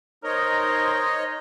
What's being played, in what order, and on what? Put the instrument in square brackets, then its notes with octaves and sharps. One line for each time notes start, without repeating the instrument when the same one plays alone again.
[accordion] D#4 C#5 D#5 [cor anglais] A#4 [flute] C5